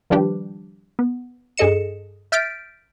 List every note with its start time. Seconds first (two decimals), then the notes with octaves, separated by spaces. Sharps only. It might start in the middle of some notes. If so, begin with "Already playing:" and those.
0.10 D#3 F3 G3 D4 G4 B4
0.99 B3
1.58 G2 G#4 A4 D#5 C#7 E7
2.32 E5 F6 G6 A6 B6 D7